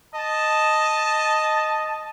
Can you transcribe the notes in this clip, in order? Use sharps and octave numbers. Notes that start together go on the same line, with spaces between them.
D#5 A5